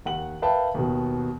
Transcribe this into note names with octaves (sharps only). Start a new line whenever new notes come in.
D#2 F#5 F#7
A#4 B4 E5 F5 G5 A5
D#2 B2